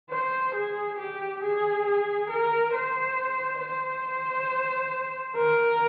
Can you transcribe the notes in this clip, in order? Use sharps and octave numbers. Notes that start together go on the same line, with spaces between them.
C5
G#4
G4
G#4
G#4
A#4
C5
C5
A#4